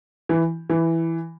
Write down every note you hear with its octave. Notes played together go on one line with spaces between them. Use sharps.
E3
E3